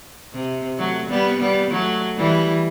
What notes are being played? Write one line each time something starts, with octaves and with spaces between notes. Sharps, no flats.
C3
F#3 A3
G3 B3
G3 B3
F#3 A3
E3 G3